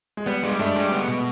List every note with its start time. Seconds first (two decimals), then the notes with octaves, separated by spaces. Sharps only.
0.17 G#3
0.26 G3 B3
0.43 G3 G#3
0.59 A3 D4
0.76 G3 G#3
0.92 B3
1.08 B2